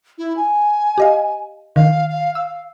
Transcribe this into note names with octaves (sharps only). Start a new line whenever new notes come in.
E4
G#5
G4 D#5 F5
D#3 F5
F5
F5 E6